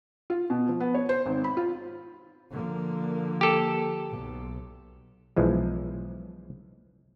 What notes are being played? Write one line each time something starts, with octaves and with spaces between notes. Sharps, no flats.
F4
B2
F3
B3
C#5
C5
G#1
B5
F4
D3 F3 A#3
G4 A4
B1
B1 E3 F3 G#3